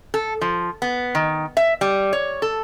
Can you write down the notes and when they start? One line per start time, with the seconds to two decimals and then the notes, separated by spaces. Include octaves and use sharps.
0.14 A4
0.41 F3
0.82 B3
1.15 D#3
1.57 E5
1.81 G3
2.13 C#5
2.42 A4